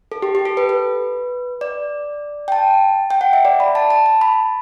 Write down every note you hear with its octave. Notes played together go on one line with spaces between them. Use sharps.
A4
G4
G4
A4
B4
B4
D5
G5
A5
G5
F#5
E5
D5
B5
A5
A5
A5
B5